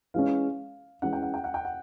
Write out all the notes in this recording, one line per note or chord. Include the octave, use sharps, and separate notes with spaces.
E3 G#3 C#4 F5
E3 G#3 C#4 F#5
G5
F#5
G5
F#5
G5
F#5